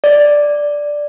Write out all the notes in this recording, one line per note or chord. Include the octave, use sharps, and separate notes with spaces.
D5